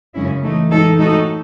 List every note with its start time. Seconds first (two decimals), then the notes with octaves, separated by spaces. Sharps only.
0.14 F#2 C#3 G#3 C#4 E4
0.43 E3 A3 D#4
0.71 A2 E3 G#3 D#4 A4
0.99 A2 G#3 D#4 F#4 A4